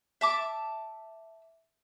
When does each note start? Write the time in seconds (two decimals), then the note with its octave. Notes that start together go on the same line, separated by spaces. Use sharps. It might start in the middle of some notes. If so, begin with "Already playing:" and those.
0.21 E5 A5 D6